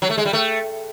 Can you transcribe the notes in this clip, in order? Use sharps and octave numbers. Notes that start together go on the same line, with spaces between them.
F#3
A3
G#3
G3
A3